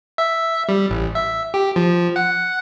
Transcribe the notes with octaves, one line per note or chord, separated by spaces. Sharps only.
E5
G3
A1
E5
G4
F3
F#5